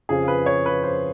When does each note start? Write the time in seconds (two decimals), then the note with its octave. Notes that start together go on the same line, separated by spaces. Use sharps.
0.09 F2 C#3 F3 G#4
0.28 B4
0.46 C#5
0.66 B4
0.83 C5